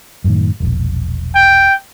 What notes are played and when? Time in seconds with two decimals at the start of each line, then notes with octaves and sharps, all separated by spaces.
0.24 F#2 A2 D#3
0.60 E1 A#1
1.35 G5